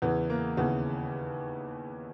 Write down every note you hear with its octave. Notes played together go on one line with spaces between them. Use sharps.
E2 C#3 E3 B3
A#3
D#2 C#3 E3 B3